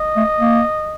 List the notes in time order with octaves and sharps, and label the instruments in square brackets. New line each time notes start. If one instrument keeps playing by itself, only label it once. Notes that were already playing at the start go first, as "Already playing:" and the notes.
Already playing: [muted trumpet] D#5
[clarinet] A3
A#3